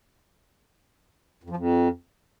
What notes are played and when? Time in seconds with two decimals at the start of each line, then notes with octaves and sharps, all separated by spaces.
1.43 F2
1.50 F3
1.56 F2